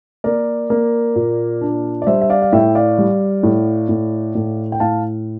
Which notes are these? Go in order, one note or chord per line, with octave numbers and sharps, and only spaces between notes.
A#3 A#4 D5
A#3
A#2
D4
D5
G3 C5 E5
E5
D5 F5
F5
A2 E5 G5
D5 F5
G3
A2
A2
A2
G5
A2 F5 A5